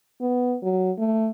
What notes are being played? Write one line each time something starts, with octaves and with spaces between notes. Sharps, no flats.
B3
F#3
A3